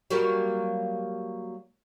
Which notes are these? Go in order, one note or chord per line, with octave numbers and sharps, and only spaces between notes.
F#3 G3 A#3